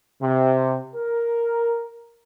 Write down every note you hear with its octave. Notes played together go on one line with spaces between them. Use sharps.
C3
A#4